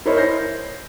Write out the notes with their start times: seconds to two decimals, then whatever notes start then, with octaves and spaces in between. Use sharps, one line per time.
0.06 E4 A#4 C5 C#5 D#5 B5
0.17 G6 A#6 C7